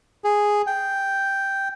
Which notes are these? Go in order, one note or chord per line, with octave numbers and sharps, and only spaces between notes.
G#4
G5